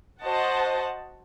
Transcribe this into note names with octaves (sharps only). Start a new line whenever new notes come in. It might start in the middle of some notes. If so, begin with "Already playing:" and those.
F#4 C5 D#5 F#5 A5